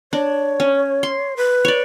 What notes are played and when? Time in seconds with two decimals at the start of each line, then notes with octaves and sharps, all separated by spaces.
0.13 D4 C#5
0.60 C#4
1.03 C6
1.37 B4
1.65 C#5 D5